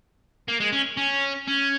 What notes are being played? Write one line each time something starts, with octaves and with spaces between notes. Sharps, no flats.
A#3
G#3
C#4
C#4
C#4